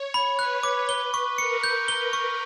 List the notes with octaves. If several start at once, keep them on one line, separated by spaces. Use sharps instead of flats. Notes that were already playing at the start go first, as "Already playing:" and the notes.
Already playing: C#5
B5
B4 F#6
D6
G7
C#6
A#4 C#7
G6
G7
C#6